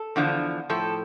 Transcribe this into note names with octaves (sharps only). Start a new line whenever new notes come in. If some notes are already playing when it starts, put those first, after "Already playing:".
Already playing: A4
E2 D3 F3
A2 F3 A4